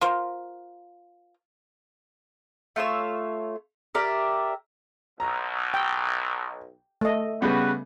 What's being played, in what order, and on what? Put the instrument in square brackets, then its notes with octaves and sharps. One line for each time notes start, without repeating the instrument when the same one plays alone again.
[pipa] F4 A#4 C5
[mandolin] A3 F4 C#5 E6
G4 A#4 D5 E5
[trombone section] B1 [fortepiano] A#5
[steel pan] G5
A3 D#5
[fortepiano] C#3 G3 B3 [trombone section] F#4 B4